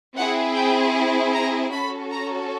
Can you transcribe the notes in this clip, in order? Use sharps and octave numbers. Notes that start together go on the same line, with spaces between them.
C4 E4 G#4 F#5
G5
A#5
C#4 F#4 A4 B5
A#5